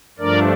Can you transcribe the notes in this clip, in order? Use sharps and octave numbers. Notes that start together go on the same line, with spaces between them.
G2 F3 A3 D4 A#4 D5